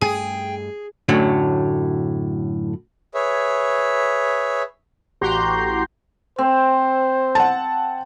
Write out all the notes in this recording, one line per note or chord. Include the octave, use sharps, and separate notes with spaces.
G2 A3 G#4 G5 G#5
F#2 A2 D3 F#3
G#4 B4 C#5 E5
A1 F#4 G4 A#5 C6 G6
C4 C5
F#5 A5